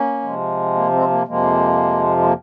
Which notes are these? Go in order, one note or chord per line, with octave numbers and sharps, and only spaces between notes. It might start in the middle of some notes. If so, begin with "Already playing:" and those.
Already playing: A#3 C#4
C3 F3 G#3
A#3
G#3 C4
A#3
F2 C3 F3 G#3 A#3
G#3
A#3